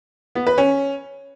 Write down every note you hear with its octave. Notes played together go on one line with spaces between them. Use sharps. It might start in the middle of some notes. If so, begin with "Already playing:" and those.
B3
B4
C#4